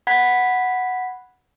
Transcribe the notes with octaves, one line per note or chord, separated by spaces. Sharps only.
F#5 B5 G#6 B6